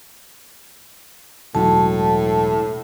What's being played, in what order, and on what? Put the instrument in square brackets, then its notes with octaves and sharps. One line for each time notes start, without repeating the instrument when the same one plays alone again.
[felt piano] E1 F#3 [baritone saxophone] A2 [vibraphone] A5